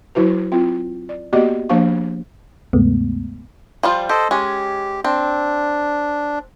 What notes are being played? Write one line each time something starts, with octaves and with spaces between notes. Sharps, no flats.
F#3 E4 F#4 B4
C4 F4
D5
A#3 B3 F#4 G4 D5 D#5
F3 A#3 D4 C5 F5 C#6
D2 G2 C3 G#3 A3 B3
F3 G3 F4
G4 A4 C5 D#5
G#3 C#4 G4
C4 D4